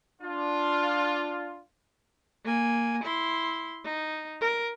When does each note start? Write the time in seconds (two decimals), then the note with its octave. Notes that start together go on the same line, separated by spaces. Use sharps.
0.21 D4 F4
2.45 A#3 G#5
3.04 E4 C6
3.85 D#4
4.41 A#4